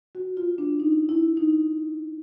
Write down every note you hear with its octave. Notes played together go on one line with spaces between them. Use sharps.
F#4
F4
D4
D#4
E4
D#4